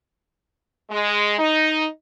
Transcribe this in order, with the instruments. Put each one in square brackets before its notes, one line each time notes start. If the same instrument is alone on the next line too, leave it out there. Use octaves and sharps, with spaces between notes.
[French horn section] G#3
D#4